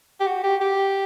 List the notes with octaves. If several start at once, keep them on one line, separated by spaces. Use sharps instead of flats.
G4
F#4
G4
G4